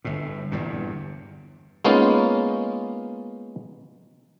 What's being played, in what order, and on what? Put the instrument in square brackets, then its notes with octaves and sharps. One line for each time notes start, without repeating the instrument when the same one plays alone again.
[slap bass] G1 A2
G1 E2 G2 A#2
[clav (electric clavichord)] G#3 A#3 B3 C#4 D#4 F4